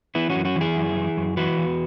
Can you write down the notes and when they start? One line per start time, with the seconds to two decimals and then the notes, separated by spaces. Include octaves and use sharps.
0.15 E3 B3 E4
0.30 C#4 F#4
0.35 F#2
0.45 C#4 F#4
0.56 E3
0.61 E4 G#4
0.77 F#2
0.97 E3
1.17 F#2
1.37 E3 F#4 B4
1.57 E2